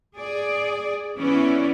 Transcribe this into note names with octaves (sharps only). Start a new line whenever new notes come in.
G#4 D5
E3 B3 C#4 E4 D5